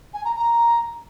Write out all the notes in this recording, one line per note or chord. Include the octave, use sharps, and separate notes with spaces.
G#5
A#5
A#5